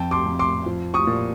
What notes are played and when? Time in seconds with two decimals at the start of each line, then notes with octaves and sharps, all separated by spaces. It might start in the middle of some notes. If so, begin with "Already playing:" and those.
Already playing: F2 G5 A5
0.11 C6 D6
0.26 F2
0.39 C6 D6
0.66 F3
0.94 C#6 D#6
1.07 A#2